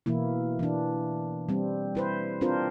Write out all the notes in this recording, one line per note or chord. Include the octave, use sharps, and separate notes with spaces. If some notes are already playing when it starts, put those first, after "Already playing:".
B2 E3 A#3 E4
E3 D4
G3 C4
E4 B4 C5
C4 D4 F4 A#4 C5